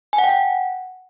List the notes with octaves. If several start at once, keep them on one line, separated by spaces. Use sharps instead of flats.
G#5
F#5
G5
F#5